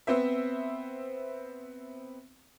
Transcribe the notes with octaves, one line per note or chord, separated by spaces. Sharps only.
B3 C4 C5 E5